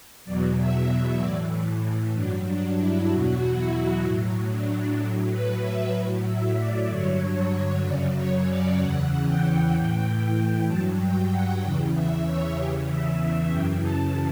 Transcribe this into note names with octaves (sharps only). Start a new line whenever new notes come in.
E2 B2 F#3 D5
E5
E5
A2 E3 D5
G2 F#3 D4
D4
E4
E2 B2 F#3 F#4
E4
A2 F#3
D4
A2 F#3 D4
B4
E5
A2 F#3 E5
E5
D5
G2 D3 F#3 C#5
C#5
F#2 C#3 F#3 D5
C#5
D5
E2 C#3 E3 F#5
G5
A2 E3 G5
G2 F#3 A5
G5
F#5
E2 C#3 E3 G5
E5
C#5
E2 C#3 E3 G4
E5
F#2 C#3 E3 G5
A5